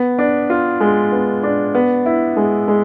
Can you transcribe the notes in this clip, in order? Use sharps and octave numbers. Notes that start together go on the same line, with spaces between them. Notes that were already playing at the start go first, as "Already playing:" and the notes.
Already playing: B3
D4
F4
G#3
B3
D4
B3
E4
G#3
G#3